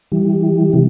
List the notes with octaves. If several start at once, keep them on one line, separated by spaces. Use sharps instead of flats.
E3 G3
C3 E3